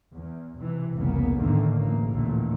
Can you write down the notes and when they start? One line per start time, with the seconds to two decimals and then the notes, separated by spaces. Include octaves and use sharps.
0.13 E2
0.57 C3 E3
0.95 F1 C2 C#3 A#3 B3
1.39 E2 A2 D3 D#3 A#3
1.73 A1 A#3
2.11 A1 D#2 A#2 D3